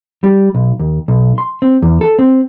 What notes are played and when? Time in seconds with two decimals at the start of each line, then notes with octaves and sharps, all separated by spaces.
0.24 G3
0.55 B1
0.80 D#2
1.08 B1
1.38 C6
1.62 C4
1.82 E2
2.01 A4
2.19 C4